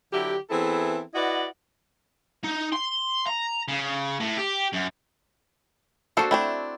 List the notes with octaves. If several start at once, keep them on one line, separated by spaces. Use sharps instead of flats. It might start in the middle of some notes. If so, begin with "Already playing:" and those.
D3 F#3 E4 G4
E3 B3 C4 E4 G#4 A4
E4 F#4 B4 D5 D#5 F#5
D#4
C6
A#5
C#3
A2
G4
F#2
A#3 D4 F#4 A4 C5
A3 C4 D4 E4